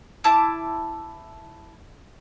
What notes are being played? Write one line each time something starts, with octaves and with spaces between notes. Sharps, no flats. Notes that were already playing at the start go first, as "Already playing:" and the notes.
E4 A5 D6